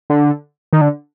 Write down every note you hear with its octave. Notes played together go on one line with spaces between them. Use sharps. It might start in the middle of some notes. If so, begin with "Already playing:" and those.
D3
D#3
D3